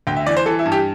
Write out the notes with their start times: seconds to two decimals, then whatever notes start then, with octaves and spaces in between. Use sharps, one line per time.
0.07 D2 G5
0.17 E5
0.27 E3 D5
0.37 C5
0.46 E3 A4
0.59 E4
0.65 G2
0.72 G4